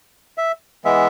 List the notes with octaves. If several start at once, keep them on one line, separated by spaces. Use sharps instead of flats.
E5
E3 G#3 B3 E5